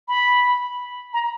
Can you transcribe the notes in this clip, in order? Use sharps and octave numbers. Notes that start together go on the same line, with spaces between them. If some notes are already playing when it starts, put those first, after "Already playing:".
B5
A#5